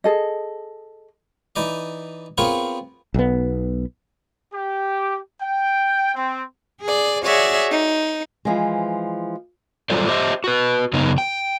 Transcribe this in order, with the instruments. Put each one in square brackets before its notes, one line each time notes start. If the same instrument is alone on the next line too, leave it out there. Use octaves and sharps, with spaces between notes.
[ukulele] G#4 A4 D#5
[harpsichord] E3 D#4 D5 D#5
B3 C4 F4 G#4 A#4 C#5
[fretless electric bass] B1 B3
[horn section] G4
G5
C4
[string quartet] G#4 D5
F#4 G#4 C#5 D5 E5
D#4
[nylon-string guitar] E3 F3 G#3
[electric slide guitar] F#3 G3 F4 A4 C5 D5
G4 C5 D#5 E5
F#4 B4
F#2 C#3 B3 D#4
G5